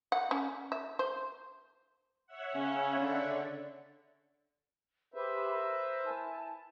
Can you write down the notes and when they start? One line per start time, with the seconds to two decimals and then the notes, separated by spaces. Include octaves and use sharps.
0.12 F#5
0.31 C#4
0.72 E5
0.99 C5
2.27 C#5 E5 F#5
2.56 C#3 C#4
3.00 D3
5.14 G4 G#4 B4 C5 E5 B5
5.52 A#4
6.04 E4 G#5 A5